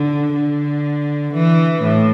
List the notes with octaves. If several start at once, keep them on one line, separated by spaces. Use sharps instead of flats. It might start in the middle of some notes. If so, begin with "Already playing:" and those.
Already playing: D3
D3
E3
A2